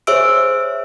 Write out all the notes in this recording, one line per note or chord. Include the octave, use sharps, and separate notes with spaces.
G#4 C5 C#5 E5 E6 D7